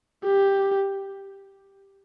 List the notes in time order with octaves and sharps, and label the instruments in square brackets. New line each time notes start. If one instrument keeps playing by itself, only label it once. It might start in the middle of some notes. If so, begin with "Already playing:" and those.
[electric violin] G4